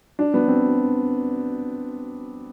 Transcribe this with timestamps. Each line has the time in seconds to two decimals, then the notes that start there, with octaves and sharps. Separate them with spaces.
0.19 D4
0.34 B3
0.48 C4